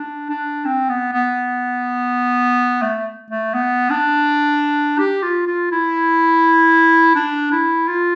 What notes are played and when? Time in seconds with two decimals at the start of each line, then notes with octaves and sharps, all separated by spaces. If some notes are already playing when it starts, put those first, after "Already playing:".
Already playing: D4
0.30 D4
0.65 C4
0.89 B3
1.13 B3
2.82 A3
3.31 A3
3.54 B3
3.90 D4
4.99 G4
5.23 F4
5.47 F4
5.72 E4
7.15 D4
7.52 E4
7.88 F4